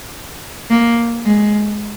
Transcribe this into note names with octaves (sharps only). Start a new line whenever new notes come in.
A#3
G#3